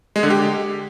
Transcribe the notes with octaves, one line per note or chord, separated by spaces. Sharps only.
G#3
D3
G4